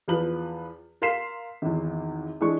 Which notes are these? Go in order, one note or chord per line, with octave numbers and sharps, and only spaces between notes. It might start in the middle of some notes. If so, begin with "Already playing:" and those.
E2 F3 B4 F#7
A#4 F5 C6 B6 C7 E7
G#1 E2
E3 G#3 D4 C#6